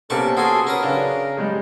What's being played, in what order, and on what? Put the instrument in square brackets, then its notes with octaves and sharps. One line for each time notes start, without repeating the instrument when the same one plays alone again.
[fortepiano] C3 A#3 B3 [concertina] C#4 A4 A#4 [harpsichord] D5 C#6
[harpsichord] F#4 G#5 [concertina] G#4 A4 C6
[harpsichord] C#4 B4 D#6 [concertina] A#4
[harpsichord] C#3 [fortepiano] D4 F#4
[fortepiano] G3 G#3 G#4